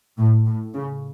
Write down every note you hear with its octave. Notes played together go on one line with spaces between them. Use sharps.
A2
A2
C#3